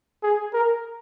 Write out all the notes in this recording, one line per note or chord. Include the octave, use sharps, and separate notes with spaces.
G#4
A#4